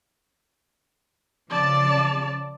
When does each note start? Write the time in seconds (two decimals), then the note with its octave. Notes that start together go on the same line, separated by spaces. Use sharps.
1.50 C#3 F3 D5 A5